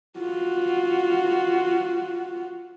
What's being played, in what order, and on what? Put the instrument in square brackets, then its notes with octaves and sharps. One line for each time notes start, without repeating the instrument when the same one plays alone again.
[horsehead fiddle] F4 F#4